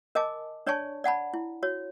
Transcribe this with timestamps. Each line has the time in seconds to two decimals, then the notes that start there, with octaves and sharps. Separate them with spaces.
0.15 A#4 D#5 G#5 A5 D6
0.66 D4 C#5 D5 G#5 A5 C#6
1.04 D5 F#5 A5 B5
1.34 E4
1.63 F#4 C#5